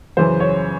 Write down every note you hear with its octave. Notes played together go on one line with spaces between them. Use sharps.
F#2 C#3 E3 C5
C#5